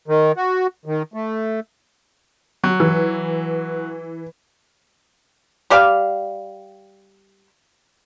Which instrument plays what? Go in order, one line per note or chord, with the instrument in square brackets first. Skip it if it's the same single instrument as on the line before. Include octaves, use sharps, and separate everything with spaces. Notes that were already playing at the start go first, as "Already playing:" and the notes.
[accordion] D#3
F#4
D#3
A3
[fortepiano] F#3
[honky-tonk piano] E3
[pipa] G3 G4 D5 F5